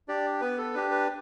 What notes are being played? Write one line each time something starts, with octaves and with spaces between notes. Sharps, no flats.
D4 G4 D5
B3 B4
A4
D4 G4 B4
B4